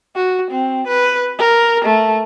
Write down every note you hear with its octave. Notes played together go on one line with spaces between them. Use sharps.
F#4
C4
B4
A#4
A3